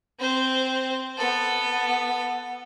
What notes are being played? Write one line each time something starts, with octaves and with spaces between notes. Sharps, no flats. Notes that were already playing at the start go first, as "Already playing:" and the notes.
C4 C5
B3 A4